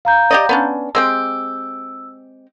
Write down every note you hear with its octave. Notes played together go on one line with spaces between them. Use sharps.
F5 A#5 G6
G4 D5 D#5
B3 C#4 D4
G#3 C4 G4 E6